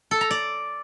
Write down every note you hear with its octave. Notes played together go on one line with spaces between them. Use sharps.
A4
A#5
D5